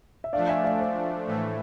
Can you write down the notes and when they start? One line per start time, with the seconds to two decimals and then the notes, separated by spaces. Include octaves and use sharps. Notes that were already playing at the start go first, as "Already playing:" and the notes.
0.24 E5
0.33 F3 A3 D4 D5 F5
0.49 E5 G#5
0.64 D5 F5
0.79 C5 E5
1.26 A2 E3 A3